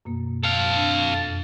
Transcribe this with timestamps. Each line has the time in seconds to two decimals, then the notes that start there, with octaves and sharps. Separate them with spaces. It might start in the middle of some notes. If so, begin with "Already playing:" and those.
0.05 F#2 B2 A#3
0.44 A4 F5
0.76 D4
1.11 F2 A6